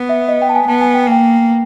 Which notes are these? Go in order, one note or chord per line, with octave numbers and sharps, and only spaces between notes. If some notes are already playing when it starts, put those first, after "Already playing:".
Already playing: B3
E5
D#5
G5
A5
G#5
B3 A5
G#5
G5
G#5
A#3 G5